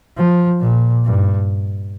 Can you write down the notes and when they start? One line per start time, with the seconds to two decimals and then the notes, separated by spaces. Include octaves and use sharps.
0.17 F3
0.61 A#2
1.05 G2